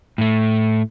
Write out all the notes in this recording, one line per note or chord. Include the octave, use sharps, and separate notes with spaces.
A2 A3